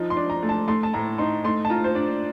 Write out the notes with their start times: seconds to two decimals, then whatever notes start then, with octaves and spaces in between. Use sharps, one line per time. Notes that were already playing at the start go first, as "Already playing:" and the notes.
Already playing: F3 D#4
0.10 C6
0.17 D4
0.30 A#5
0.43 A3
0.49 A5
0.68 A3 C6
0.83 A5
0.94 A2 A#5
1.18 D#4 C6
1.44 A3 C6
1.65 A5
1.70 F4 A#5
1.84 C5
1.95 D4 D5